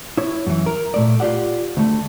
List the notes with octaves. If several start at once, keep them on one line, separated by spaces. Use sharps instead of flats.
E4 C#5
F#2 E3
A#4
A#2 A3 D5
F4 G4 D5 F#5
D2 A3